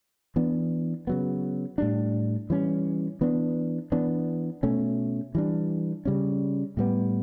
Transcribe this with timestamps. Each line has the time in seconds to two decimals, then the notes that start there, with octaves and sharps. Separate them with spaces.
0.36 E3 B3 D4
1.07 C#3 F#3 B3
1.78 A2 G3 D4
2.50 E3 G3 C#4
3.21 E3 B3 D4
3.92 E3 B3 D4
4.63 B2 A3 C#4
5.35 E3 G3 D4
6.05 C#3 G3 C#4
6.77 A2 G3 B3